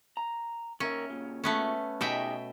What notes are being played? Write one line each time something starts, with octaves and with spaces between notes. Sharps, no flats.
A#5
D#2 C#4 A#4 E5
A#2 C#3
A3 B3 C#4
B2 D#4 G4 G#4 E5 G5